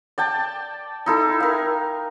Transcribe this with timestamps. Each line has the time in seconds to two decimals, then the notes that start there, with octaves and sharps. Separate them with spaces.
0.18 D5 G5 A5
1.06 D#4 E4 A4
1.40 A#4 F5